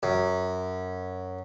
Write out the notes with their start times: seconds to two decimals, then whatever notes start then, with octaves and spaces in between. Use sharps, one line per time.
0.03 F#2